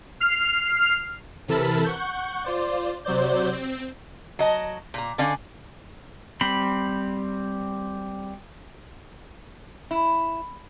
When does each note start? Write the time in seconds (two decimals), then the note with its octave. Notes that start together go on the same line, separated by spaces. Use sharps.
0.20 F6 C7
1.48 C3 E3 A4 A#4 A5 B5
1.84 F#5 C#6 G6
2.44 F4 C5 D5
3.05 C3 F#3 C5 D5 G6
3.53 C4
4.39 F#3 D#5 A5
4.94 A#2 A#5
5.18 D3 C#4 D5 F5 G#5
6.41 G3 C4 B5
9.91 E4